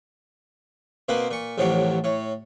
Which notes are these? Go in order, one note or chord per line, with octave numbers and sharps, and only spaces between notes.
B2 A#3 C4 B4
A#2 C#6
A1 F2 A2 C3 F#3 C#5
A2 C#5